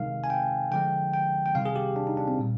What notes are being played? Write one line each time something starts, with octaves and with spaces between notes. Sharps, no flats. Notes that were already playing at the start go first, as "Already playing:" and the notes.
Already playing: C3 D#3 G#3 F5
G#5
G5
D3 F3 G#3 G5
G5
G5
C3 D#3 G3 F5
G#4
G4
D4
D#4
D4
C4
A#2 G3